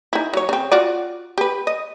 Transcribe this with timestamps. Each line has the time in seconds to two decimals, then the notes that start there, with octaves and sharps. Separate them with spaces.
0.13 D#4 E4
0.33 F#3 C#5
0.49 C#3 C4
0.71 F4 F#4 D5
1.38 G4 B4
1.67 D#5